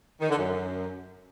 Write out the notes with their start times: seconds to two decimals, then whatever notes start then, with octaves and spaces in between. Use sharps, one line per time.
0.20 D#3
0.29 D3
0.38 F#2